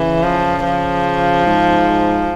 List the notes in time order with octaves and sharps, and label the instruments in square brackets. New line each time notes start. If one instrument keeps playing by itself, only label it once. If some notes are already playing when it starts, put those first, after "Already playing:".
Already playing: [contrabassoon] C#3 [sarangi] E3
[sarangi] F3
F3
[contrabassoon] G#2